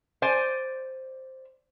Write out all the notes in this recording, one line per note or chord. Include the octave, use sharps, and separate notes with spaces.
C5 D5 G#5